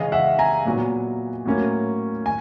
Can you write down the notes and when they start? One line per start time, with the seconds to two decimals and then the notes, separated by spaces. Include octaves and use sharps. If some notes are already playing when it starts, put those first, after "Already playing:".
Already playing: C#3 E3 G#3 C#4 D#5 F5
0.12 E5 F#5
0.39 G#5 A#5
0.65 A#2 F#3 B3
1.45 A2 F#3 A#3 C#4
2.26 G#5